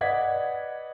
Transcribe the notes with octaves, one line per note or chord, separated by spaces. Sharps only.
B4 D5 D#5 F#5 G#6 B6